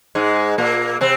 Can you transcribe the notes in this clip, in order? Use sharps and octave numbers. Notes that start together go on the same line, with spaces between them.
G#2 G#3
A#2 A#3
C3 C4